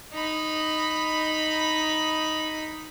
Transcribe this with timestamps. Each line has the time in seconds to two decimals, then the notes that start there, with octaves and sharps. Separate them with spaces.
0.13 D#4 B5